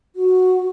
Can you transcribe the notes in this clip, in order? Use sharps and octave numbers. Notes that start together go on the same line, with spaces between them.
F#4